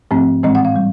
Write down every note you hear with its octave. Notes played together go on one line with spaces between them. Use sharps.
G#2 F3 A3 C4
A2 E3 G#3 C4 D#5
F#5
F5
G3